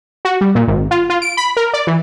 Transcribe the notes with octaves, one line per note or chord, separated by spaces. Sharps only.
F#4
G3
A#2
G#1
F4
F4
D7
B5
A#4
D5
E3